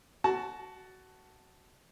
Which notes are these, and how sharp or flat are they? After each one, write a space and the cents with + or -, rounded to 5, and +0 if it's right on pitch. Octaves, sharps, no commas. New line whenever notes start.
F#4 +15 A5 +0